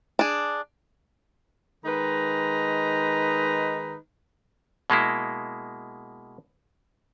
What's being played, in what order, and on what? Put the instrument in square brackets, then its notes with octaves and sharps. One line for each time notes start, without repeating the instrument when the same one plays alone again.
[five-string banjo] D4 G#4
[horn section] D#3 G#3 D#4 B4 A#5
[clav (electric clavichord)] B2 G#3 A#3 E4